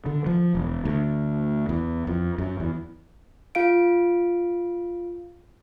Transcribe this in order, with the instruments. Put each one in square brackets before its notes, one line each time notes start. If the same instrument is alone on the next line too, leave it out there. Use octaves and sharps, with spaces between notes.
[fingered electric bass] D3
F3
E1
D2
E2
F2
F#2
E2
[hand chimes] F4 F5 D7